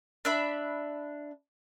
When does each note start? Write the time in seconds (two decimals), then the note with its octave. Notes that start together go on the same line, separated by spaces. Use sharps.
0.25 D4 E5 B5